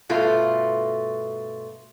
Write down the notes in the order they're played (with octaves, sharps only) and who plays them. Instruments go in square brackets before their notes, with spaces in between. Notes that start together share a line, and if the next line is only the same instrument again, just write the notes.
[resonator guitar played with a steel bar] G2 B2 A3 F4